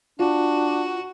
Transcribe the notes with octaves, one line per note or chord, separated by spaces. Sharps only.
D4 F4 F#4